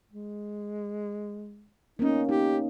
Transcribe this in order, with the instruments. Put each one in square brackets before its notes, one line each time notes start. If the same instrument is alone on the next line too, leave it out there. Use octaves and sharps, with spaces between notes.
[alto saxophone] G#3
[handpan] A#3 B3 C#4 [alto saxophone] D#4
[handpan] D#4 [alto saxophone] G4